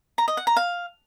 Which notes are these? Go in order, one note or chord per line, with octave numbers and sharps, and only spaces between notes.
A#5
D#5
F#5
A#5
F5